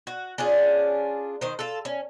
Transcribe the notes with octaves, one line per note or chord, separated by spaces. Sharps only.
F#4
C#4 D4 F4 G#4
D#3 C5
F4 A4
C#4